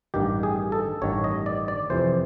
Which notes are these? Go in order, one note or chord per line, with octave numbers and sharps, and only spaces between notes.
A1 G2 D#3 G4
G#4
A4
A1 G2 D#3 C#5
D#5
D5
D5
F2 C3 E3 C5